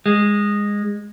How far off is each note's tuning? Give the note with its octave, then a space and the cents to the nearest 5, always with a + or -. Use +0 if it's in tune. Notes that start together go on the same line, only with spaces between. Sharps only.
G#3 -15